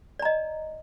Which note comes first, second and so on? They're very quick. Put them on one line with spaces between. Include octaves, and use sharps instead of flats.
D5 A#5 D#5